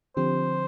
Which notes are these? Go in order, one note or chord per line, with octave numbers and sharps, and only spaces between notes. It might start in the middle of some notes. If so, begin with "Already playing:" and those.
D3 F3 C4 G4 C5